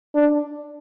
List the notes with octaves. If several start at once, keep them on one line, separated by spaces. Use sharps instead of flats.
D4